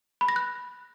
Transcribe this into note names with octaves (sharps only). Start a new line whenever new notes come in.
B5
A#6
F#6